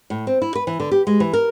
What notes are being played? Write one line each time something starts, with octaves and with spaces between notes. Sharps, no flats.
A2
C4
E4
B4
E3
D3
G4
G#3
E3
A#4